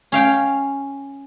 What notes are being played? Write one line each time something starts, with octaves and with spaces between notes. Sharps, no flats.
C#4 F5 G5